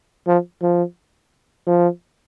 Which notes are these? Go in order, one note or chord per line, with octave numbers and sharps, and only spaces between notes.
F3
F3
F3